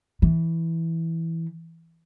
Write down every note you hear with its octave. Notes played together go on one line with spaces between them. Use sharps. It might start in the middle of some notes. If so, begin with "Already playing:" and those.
E3